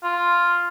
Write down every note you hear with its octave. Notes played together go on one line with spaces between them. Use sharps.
F4